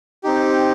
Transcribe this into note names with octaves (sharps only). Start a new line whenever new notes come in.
C4 D#4 G4